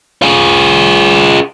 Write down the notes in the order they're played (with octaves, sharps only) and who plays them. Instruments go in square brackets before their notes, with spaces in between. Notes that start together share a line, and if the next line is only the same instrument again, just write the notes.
[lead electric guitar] F4 G#4